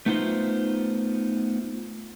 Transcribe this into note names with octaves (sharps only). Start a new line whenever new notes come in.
A3 B3 D#4 F4 C5